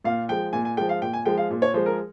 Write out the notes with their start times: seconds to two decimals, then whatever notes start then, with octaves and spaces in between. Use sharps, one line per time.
0.04 A#2 F5
0.29 F3 G#3 G5
0.53 A#2 G#5
0.65 G#5
0.77 F3 G#3 G5
0.89 F5
1.02 A#2 G5
1.13 G#5
1.26 F3 G#3 G5
1.37 F5
1.50 A#2
1.62 C#5
1.74 F3 G#3 C5
1.86 A#4